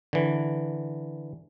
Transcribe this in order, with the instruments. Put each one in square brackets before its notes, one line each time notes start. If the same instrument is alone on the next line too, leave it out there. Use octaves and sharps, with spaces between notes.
[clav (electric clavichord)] D3 E3